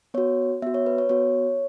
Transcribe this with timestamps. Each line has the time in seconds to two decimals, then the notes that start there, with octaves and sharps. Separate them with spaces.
0.14 B3 F#4 C#5
0.62 B3 E5
0.67 F#4
0.74 C#5
0.86 B4
0.98 C#5
1.09 B3 F#4 C#5